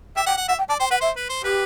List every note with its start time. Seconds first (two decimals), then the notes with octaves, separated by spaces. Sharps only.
0.16 E5 G5
0.26 F#5 G5
0.37 F#5
0.48 E5 F#5
0.59 G5
0.69 D5 A5
0.80 C5 G5
0.91 B4 F#5
1.01 C5 E5
1.16 B4
1.29 C5
1.43 G4 B4